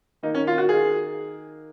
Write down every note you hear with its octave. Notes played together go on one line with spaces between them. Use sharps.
D#3 A#3 D#4
C#4
F4
F#4
G#4